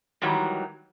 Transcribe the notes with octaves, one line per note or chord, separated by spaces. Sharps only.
G#2 D#3 E3 F#3 G3